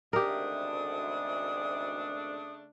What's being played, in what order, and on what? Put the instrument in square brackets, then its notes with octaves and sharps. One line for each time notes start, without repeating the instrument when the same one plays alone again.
[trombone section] G#1 D2 [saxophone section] C#3 A3 D4 [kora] G4 A#4 [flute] D#6